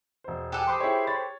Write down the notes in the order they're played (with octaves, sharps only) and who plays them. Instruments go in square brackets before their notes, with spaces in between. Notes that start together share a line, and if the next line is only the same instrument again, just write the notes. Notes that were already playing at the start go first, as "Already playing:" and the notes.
[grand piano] E1 C5
[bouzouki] G4 A4 [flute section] F#5 G#5 F#6
[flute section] C5 B5 [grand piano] C6 D6 D#6
[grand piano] E4 G#4 C#5
C#5 A6